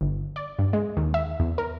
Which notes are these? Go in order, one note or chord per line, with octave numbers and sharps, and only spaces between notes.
G1
D5
G2
G#3
D#2
E5
E2
A#4